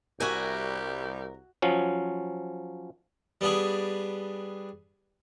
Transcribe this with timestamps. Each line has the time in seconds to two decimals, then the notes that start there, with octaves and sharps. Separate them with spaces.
0.20 C2 G3 F#4 A#4 E5 G#5
1.62 F3 F#3 C#4
3.41 G3 B3 D4 G#4